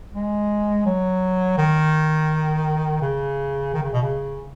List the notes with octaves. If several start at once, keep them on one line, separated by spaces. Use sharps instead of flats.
G#3
F#3
D#3
C#3
D#3
C#3
B2
C#3